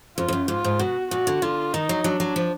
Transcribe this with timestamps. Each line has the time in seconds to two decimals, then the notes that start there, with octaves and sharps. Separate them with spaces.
0.17 F2 F4
0.28 F2
0.33 F#2
0.48 G#2 F4
0.64 G#2
0.79 B2 F#4
1.11 A#2 F#4
1.27 D3
1.42 D3 F4
1.73 D#3 D#4
1.89 F#3
2.04 F#3 D4
2.20 F#3
2.36 F3